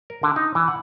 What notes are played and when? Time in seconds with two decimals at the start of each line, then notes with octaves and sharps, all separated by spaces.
0.10 A#4
0.23 D3
0.36 D#4
0.55 E3
0.68 F#5